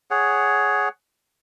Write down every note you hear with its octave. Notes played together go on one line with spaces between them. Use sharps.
G#4 C#5 F#5